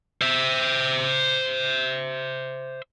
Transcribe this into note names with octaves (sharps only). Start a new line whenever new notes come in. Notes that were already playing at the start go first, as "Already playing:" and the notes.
C5 E5